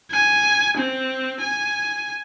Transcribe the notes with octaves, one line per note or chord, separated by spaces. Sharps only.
G#5
C4
G#5